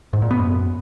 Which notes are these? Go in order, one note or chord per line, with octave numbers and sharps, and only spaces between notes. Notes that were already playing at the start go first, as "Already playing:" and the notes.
G#2
A#2
B3
F#2